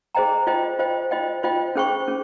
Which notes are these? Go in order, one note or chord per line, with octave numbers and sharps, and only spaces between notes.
G#4 C5 D#5 G5 A#5
F4 C5 D#5 G5
F4 C5 D#5 G5
F4 C5 D#5 G5
F4 C5 D#5 G5
C#4 G#4 C5 G5 C#6
C#4 G#4